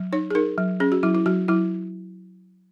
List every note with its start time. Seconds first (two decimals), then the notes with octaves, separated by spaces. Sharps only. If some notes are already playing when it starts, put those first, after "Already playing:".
Already playing: F#3
0.13 D#4 C#5
0.31 G#4
0.35 D#4 A#4
0.58 F#3
0.80 C#4 G#4
0.92 F#4
1.03 F#3 E4
1.15 E4
1.26 F#3 F#4
1.48 F#3 E4